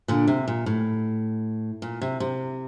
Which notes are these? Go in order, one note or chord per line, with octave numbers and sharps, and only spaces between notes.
A#2 D3
C3
A#2
A2
A#2
C3
C3